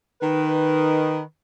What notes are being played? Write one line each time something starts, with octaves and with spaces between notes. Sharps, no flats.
D#3 B4